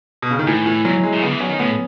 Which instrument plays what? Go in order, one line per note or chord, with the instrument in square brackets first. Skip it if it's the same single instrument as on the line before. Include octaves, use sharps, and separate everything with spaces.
[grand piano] B2
C#3
D#3
[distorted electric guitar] A2 [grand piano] E3
[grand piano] E3
[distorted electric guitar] G#2 [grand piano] F#3
[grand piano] G#3
[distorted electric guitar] A2
[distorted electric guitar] C#3 [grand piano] B3
[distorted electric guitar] E3
[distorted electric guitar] F#3 [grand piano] C#4
[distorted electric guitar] D#3
[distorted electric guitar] A2 [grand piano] B3